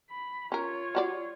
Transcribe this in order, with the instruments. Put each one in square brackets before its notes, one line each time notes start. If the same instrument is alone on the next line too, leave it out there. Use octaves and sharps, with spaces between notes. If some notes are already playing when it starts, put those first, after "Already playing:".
[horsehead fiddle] B5
[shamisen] C#4 A#4 [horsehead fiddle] F4 C#5
[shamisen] G3 F#4 D5